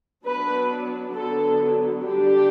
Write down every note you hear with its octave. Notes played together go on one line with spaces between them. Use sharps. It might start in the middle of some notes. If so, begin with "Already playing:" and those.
F#3 B3 D4 B4
D3 F#3 B3 A4
D3 G3 D4 G4